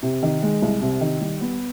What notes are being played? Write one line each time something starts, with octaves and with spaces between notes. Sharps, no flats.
C3
D#3
G#3
C2
C3
D#3
G3
B3